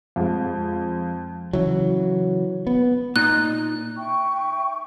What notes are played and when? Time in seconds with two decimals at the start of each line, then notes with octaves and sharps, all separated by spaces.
0.16 F2 G#3
1.53 C#3 E3 F#3
2.67 B3
3.16 A#2 D#4 F#6
3.98 E5 G5 C#6